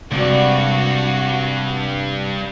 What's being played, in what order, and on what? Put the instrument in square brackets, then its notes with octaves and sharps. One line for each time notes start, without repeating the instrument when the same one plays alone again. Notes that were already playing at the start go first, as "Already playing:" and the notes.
[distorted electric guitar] G2 [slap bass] C3 G#3 C4 [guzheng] G3 A#3 G4 [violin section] F#4